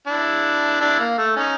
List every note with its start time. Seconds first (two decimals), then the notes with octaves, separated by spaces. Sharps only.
0.07 D4 E4
0.81 D4 E4
1.00 A#3
1.18 A3
1.36 C#4 D#4